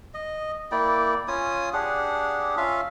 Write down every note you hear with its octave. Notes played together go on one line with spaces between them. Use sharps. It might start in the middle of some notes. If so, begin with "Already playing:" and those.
D#5
A#3 E4 D5 G5
C#4 F4 G#5 D#6
D4 G4 G#4 F#5
C#4 F4 E5 F5